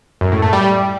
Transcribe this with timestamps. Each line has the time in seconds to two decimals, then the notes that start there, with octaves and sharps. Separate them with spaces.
0.21 F#2
0.32 A2
0.42 A3
0.53 G3